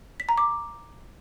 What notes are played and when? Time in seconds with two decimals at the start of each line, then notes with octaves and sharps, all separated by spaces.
0.20 B6
0.29 A#5
0.38 D6